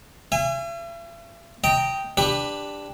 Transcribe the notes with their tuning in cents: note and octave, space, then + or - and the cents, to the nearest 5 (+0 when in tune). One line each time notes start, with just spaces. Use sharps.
E5 +45 G#5 -25
D#5 +10 G5 +0 A#5 -30
D4 +0 G4 +20 B4 +0